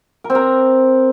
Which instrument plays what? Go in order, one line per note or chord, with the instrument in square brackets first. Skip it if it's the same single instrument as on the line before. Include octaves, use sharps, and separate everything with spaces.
[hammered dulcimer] A#4
C4
A#4